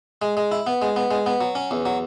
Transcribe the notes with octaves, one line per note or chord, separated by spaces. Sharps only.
G#3
G#3
E4
B3
G#3
B3
G#3
B3
F#3
C#4
E2
F#3